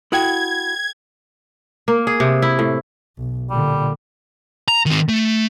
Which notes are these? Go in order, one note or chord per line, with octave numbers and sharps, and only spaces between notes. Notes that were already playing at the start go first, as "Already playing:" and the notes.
E4 F#4 A4 F#5 G5 G#6
A#3
G#4
C3
E4
A2
B1
A#2 D3 G3
A#5
D#3 C4
A3